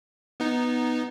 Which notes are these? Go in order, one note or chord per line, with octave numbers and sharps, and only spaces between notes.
B3 D#4